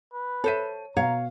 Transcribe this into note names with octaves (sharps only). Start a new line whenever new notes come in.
B4
A4 C5 C#5 E5 D#7
B2 C#5 F5 A#5